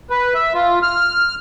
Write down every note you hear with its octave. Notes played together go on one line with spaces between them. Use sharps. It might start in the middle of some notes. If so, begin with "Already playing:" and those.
B4
E5
F4
F6